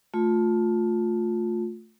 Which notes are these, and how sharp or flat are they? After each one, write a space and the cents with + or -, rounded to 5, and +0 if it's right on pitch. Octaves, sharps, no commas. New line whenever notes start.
A3 +0 F4 +20